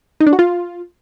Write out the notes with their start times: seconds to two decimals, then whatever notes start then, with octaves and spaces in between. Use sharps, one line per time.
0.20 D#4
0.27 D4
0.33 F#4
0.39 F4